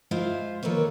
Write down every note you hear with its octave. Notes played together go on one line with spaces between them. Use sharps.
G#3 E4 F4 C5 E5 F5
D#3 A#3 A4 B4 C#5